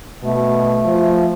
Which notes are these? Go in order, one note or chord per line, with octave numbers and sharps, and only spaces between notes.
B2 A3
F3